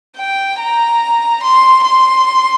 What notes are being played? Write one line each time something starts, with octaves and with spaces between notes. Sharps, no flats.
G5
A#5
C6
C6